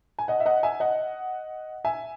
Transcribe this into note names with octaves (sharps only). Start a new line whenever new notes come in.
G#5
D#5 F#5
E5
D#5 F#5
E5 G#5
D#5 F#5
E5 G#5